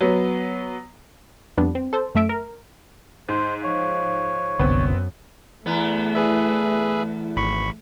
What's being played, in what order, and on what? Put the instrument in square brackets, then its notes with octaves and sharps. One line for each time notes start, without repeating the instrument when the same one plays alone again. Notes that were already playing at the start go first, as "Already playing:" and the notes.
[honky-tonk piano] F#3 B3
[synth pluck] F2 G3 B3 D4
C4
A4 C5
F#2 A3 E5 D7
A#4
[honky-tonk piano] G#2 [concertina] C5
[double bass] F3 [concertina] C#5
[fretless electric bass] F#1 C2 D3 [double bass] F#2 [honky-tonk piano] B3 C4
[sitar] E2 B3 [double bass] A3
[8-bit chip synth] G#4 B4 E5
G#1 B5 C#6